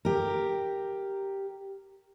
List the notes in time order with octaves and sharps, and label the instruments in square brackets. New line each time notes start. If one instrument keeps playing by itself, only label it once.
[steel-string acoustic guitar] G4 A#4